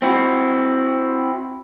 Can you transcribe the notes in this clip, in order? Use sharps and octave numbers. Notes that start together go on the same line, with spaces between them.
C4 E4 F#4